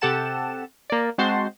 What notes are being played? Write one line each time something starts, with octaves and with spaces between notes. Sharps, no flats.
C3 G4 A4 F#5 A5 E7
A#3 D5
G#3 C4 F#4 C5 A5 C6